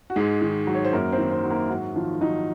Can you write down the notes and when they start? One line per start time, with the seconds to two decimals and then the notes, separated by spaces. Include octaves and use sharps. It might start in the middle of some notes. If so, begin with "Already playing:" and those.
0.10 F#4
0.16 G#2 G#3 G#4
0.42 D#3
0.67 F#3
0.75 C#5
0.85 C5
0.93 F#2 A#3 A#4
1.12 C4 C5
1.18 D#3
1.31 C4 C5
1.44 F#3
1.50 A#3 A#4
1.69 G#2 F#3 F#4
1.95 D#3 F3 F4
2.21 D#3 F#3 D#4